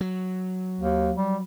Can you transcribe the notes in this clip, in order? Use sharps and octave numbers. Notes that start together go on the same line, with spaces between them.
F#3
D#2
G3